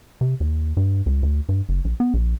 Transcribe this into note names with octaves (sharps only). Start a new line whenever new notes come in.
C3
D#2
G2
C#2
D2
G2
F#1
A#1
B3
A#1